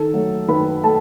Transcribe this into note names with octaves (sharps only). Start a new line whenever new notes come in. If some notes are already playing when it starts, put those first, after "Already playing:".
Already playing: D#3 A4
F#3 A3
D#3 B4 B5
A3 A4 A5